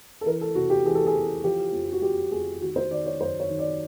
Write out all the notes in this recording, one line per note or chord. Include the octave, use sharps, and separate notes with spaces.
A4
E3 A#4
A4
C3 F#4
G4
E3 G#4
A4
G#4
E3
F3 G4
F2
F#4
F2 G4
F2 G#4
D#3 F#4
C5
D#3 D5
C#5
F#2 C5
C#5
D#3
D5